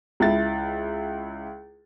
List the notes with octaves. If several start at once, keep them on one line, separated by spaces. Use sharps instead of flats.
C#2 E4 A6